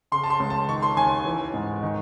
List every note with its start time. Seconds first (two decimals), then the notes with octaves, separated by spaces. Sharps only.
0.12 C#3 C6
0.24 A5
0.30 C6
0.40 C#2
0.50 A5
0.68 D#3 C#6
0.83 C6
0.97 D#2 G#5
1.25 E3
1.54 G#2
1.83 D#3